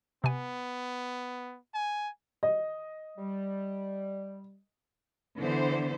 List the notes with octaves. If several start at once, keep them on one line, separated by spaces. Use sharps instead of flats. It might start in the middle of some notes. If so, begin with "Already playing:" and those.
C3 B3 G#5
G#5
D#5
G3
D3 E3 B3 D4 C5